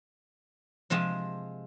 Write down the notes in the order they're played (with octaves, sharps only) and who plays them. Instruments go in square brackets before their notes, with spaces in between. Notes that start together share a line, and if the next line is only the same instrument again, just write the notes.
[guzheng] C3 F3 G#3 C4